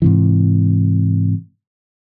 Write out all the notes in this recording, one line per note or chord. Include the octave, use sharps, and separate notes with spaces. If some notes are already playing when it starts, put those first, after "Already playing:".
G#2 C3 E3